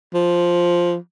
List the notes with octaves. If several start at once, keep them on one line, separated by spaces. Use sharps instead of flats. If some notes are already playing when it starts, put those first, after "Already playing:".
F3